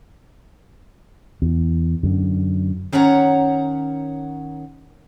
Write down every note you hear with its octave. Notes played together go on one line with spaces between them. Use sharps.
E2
F#2 D3
D#3 C#4 C#5 F#5 A#5